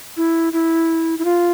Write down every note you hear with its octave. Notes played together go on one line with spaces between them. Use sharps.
E4
E4
E4
F4